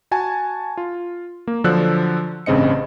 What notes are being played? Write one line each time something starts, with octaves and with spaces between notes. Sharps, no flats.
F#4 G#5 A5
F4
A#3
D3 F3 F#3 D4 E6 F#6
A1 G2 C#3 C4 D#5 C#7